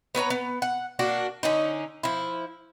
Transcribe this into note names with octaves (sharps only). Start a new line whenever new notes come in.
B3 B4 C#5 A#5
B3
F#5
A#3 D4 F#4
D3 C#4 D#4
F3 E4